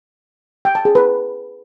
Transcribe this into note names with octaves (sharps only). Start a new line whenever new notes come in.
G5
A5
G#4
B4